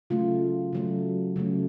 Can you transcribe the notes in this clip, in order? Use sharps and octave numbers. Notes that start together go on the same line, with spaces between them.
C#3 F#3 A3 F4
C#3 F#3 A3
C#3 F#3 A3